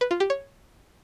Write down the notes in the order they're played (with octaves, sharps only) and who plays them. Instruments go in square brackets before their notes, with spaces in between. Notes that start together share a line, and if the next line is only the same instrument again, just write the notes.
[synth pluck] B4
F4
G4
C#5